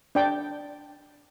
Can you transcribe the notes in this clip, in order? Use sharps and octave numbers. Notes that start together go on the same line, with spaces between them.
D4 D5 G5